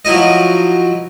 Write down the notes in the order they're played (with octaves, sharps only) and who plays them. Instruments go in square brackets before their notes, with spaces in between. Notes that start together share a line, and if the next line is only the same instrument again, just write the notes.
[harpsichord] F3 F#3 E4 D#5